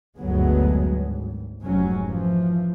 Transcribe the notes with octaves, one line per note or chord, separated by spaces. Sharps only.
F#1 D2 G2 F#3 G#3 B3
G#1
F1 G#2 F#3 C#4
E3 F3